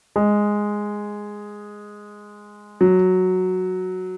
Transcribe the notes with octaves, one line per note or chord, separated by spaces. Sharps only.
G#3
F#3